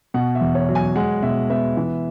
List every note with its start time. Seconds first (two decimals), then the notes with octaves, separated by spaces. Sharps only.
0.14 B2 F#5
0.35 E5
0.41 E2
0.55 C#5
0.69 F#3
0.75 G#5
0.96 G#3 F#5
1.23 B2 E5
1.49 B3 E5
1.77 E3